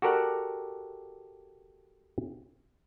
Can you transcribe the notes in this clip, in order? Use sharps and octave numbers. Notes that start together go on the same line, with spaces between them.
F#4 G4 A4 A#4 D5 F#5